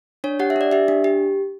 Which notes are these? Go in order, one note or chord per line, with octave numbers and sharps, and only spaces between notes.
D4 C#5
G4 F#5
E5
D4 D5
G4 E5
D4
G4